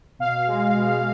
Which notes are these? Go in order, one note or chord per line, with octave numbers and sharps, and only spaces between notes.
B2 F5
G#3
B2